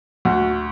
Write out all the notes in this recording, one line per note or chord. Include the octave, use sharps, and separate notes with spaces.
D2 F#4